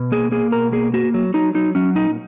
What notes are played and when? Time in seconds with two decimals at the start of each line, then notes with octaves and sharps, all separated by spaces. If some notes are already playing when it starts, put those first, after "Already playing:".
Already playing: B2
0.12 A#3 G#4
0.32 A#3 G#4
0.52 B2 A#4
0.72 A#3 G#4
0.93 A#3 F#4
1.14 F#3
1.34 F#3 D#4
1.55 F#3 D#4
1.75 F#3 C#4
1.95 A#2 D#4